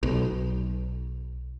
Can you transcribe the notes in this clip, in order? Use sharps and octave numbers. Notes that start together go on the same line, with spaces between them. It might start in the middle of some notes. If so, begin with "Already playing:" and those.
B1